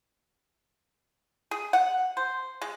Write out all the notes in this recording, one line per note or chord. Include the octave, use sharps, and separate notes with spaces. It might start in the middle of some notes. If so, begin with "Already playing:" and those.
G#4
F#5
C5
G#3